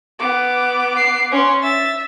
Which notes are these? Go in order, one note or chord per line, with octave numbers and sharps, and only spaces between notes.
B3 D6
C7
C#4 C6
E5 A6